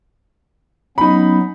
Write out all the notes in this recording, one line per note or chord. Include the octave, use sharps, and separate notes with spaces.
F#3 B3 C#4 D#4 B5